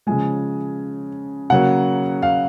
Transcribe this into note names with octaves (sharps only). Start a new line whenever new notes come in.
C#3 F3 G#3 G#5
C#3 F#3 A#3 F#5
F5